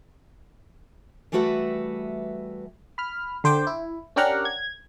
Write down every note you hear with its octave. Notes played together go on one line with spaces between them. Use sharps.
E3 G3 A3 F#4 B4 E5
B5 F6
D3 C5 G5 D6
E4
C#4 D4 G4 A#4 F#5 A#5
G#6